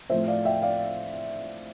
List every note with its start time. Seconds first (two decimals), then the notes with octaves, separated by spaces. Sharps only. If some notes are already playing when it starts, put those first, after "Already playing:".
0.10 A2 F3 A3 C4 C5 E5
0.27 D5 F5
0.45 E5 G5
0.62 D5 F5